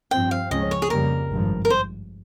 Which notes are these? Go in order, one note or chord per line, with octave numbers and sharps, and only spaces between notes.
G2 F3 C4 G5
F5
C#2 C#3 F3 G#3 C#4 D#5
C#5
G#4
F2 C#3 G3 A#3 A#4
G#1 G2 F3
A#4
C5